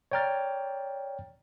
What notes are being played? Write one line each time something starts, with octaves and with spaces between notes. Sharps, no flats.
C#5 D5 G5 A#5 F6 A6